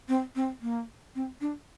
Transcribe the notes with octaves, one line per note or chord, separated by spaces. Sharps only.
C4
C4
A#3
C4
D4